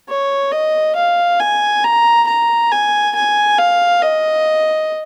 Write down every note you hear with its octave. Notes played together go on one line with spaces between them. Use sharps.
C#5
D#5
F5
G#5
A#5
A#5
G#5
G#5
F5
D#5